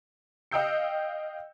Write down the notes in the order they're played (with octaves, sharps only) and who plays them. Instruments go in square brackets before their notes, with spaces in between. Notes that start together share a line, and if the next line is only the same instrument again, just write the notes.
[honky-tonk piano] D#5 F5 G5 E6 G6 C#7